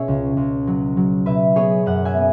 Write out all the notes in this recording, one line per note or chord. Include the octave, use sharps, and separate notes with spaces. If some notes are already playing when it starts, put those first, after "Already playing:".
Already playing: B2 C#4 G#4 C#5 E5
C#2
C#2
F#3
F#3
B2 B4 E5
B3 G#4 C#5
F#2 C#5 F#5
E5 G#5
B3